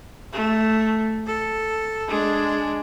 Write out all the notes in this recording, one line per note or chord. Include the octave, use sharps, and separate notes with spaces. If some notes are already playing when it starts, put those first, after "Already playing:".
A3
A4
G#3 D4